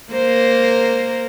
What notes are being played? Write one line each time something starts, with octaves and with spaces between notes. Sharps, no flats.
A#3 A#4 C5